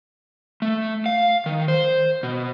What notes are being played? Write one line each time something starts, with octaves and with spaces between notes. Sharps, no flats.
A3
F5
D#3
C5
B2